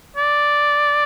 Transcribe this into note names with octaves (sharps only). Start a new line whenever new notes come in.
D5